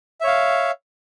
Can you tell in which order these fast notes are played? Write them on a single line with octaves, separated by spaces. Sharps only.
E5 C#5 F5